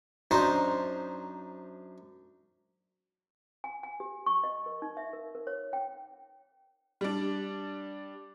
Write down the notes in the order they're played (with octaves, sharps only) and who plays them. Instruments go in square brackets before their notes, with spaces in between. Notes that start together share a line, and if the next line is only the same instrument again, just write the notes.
[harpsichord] F#2 D4 D#4 C5
[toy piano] G#5
G#5
G4
C#6
D#5
A#4
D#4
E5
A#4
A#4
C#5
G5
[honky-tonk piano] G3 D4